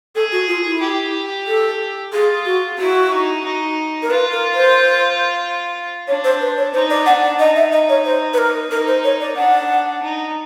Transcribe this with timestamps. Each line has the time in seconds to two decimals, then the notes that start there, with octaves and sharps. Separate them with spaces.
0.15 G#4 A4
0.32 F#4
0.48 F4
0.65 E4
0.81 G4
1.47 A4
2.13 F4 G#4
2.46 F#4
2.78 E4 F#4
3.12 D#4
3.44 D#4
4.03 A#4
4.10 F4 B4
4.32 A#4
4.54 C5
6.07 D4 C#5
6.24 C5
6.41 B4
6.57 C#5
6.74 D#4 C5
6.90 D5
7.06 D4 F#5
7.23 F#5
7.39 D#4 D#5
7.55 E5
7.72 D#5
7.89 C#5
8.05 C5
8.33 B4
8.38 A#4
8.70 D#4 A#4
8.87 C5
9.04 C#5
9.20 D5
9.36 D4 F#5
10.02 D#4